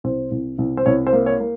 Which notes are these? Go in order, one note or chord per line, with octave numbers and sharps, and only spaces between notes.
C2 C5
C2
C2
C5
C2 C#5
C5
A#3
C#5
A#3